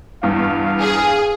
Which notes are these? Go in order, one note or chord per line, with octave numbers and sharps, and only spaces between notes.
E2 G2 F5
G#4